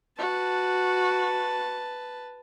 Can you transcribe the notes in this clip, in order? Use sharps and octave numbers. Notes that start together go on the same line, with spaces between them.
F#4 B4 A5